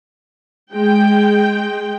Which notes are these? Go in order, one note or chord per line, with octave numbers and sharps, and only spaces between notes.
G#3 G5